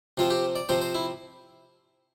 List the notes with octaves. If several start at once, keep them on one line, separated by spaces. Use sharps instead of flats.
C3 F3 C4 F4
G4
D5
C3 F3 C4 C5
C5
E4